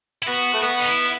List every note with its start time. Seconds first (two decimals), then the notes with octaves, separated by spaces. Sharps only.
0.23 E4
0.27 B3 F#4
0.53 A3
0.62 B3 F#4
0.79 D#4
0.87 E4